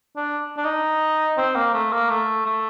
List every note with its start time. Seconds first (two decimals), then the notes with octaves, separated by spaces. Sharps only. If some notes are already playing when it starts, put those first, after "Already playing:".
0.16 D4
0.57 D4
0.65 D#4
1.37 C4
1.56 A#3
1.74 A3
1.92 A#3
2.10 A3
2.46 A3